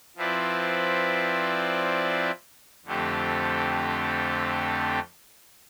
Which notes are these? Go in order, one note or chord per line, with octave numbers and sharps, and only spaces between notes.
F3 C4 E4 B4 D5
F2 D3 A3 C4 G4